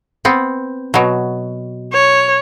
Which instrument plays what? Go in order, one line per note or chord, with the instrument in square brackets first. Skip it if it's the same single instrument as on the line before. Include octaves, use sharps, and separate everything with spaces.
[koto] B3 C4
B2 F#3
[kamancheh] C#5